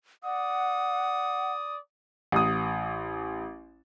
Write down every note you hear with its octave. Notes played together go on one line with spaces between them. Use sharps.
D5 F#5 D#6
A1 D#6